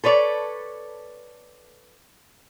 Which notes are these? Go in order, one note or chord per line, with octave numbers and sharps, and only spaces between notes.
A4 B4 C#5 D5